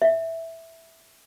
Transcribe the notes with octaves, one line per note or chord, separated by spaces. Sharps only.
E5